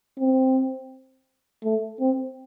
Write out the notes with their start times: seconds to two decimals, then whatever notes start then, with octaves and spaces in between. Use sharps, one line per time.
0.19 C4
1.64 A3
2.00 C4